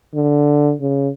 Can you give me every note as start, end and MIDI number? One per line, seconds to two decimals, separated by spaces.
0.15 0.74 50
0.81 1.09 49